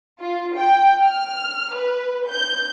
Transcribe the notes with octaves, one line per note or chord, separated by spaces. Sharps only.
F4
G5
F6
B4
G6